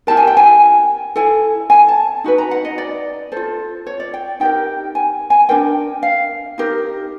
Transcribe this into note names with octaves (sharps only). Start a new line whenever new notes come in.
E4 G4 A#4 A5
G#5
G5
G#5
E4 A4 G#5
G#5
A5
D#4 F#4 B4
A#5
F#5
D#5
D5
F4 A4 C5
C#5
D5
G5
D#4 G4 A#4 G5
G#5
G#5
D4 F4 A#4 G5
F5
D#4 G4 A#4